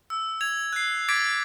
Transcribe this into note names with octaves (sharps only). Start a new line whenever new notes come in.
E6
G#6 F7
F#6 C7
D6 G#6 A6 B6 D7